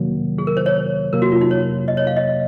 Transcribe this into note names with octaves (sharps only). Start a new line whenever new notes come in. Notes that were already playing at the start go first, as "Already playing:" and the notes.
Already playing: C3 D#3 F#3 A#3
G#4
A#4
C5
C#5
C3 F#3 A#3 A#4
F#4
F4
D#4
C#5
D#5
C#5
F5
D#5